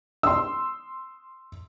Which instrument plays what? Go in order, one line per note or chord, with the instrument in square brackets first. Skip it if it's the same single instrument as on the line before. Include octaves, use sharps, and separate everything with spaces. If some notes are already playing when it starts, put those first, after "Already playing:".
[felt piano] C6 E6